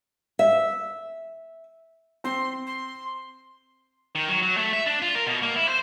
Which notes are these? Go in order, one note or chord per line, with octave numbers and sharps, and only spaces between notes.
E5
C4 C6
C6
D#3
F#3
F#3
A3
E5
D4
F4
A#4
B2
A#3
E4
C5